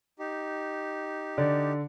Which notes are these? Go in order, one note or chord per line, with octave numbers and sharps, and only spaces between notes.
D#4 G4
D3 D5